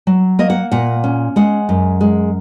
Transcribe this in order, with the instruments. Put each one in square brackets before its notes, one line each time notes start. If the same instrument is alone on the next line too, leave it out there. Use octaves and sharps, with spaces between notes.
[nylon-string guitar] F#3
A#3 D#5
F#5
A#2 F#5
C#4
G#3 F#5
F#2
G#3